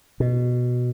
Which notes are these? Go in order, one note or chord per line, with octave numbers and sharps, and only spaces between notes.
B2